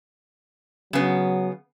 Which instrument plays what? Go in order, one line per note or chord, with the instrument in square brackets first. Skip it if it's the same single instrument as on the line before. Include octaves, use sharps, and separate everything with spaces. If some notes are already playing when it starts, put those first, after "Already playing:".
[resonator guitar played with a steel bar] C#3 B3 [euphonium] F#3